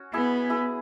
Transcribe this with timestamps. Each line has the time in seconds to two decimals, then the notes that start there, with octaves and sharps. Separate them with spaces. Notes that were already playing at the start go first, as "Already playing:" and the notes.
Already playing: C#4 F#4
0.13 B3 E4 G#4
0.50 E4 G#4